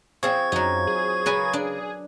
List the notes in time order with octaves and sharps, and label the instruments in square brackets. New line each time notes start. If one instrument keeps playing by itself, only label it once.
[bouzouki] F3 C4 G5 [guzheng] G#4 [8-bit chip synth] C#6 G#6
[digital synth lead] F#2 [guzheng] F#3 D#4
[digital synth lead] G#4
[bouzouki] C#3 [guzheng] A#4 B4 G#5
[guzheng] D4